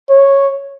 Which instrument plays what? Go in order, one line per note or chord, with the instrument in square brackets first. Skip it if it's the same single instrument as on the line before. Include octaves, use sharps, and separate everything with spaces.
[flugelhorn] C#5